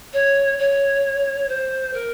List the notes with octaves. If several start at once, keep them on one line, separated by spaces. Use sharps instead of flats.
C#5
C#5
C5
A#4